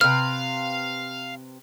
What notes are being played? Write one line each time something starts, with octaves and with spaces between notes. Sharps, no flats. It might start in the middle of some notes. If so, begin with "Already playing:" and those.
C3 B4 F5 F6